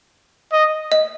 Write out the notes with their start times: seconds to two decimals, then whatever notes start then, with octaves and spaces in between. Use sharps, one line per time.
0.52 D#5
0.92 D#5